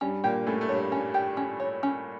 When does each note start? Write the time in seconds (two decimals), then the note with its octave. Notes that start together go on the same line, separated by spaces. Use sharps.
0.01 G2 G3 C#4
0.24 A#2 A#3 G4
0.47 A2 A3 C#4
0.61 A3
0.69 G2 G3 C#5
0.92 C#4
1.14 G4
1.37 C#4
1.60 C#5
1.83 C#4